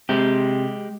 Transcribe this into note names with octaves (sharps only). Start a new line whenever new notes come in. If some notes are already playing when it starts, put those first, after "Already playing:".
C3 G#3 G4